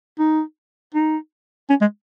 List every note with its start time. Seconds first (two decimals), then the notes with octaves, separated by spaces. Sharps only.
0.19 D#4
0.95 D#4
1.70 C#4
1.81 G#3